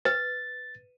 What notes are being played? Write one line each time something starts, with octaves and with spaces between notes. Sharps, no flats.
B4 A6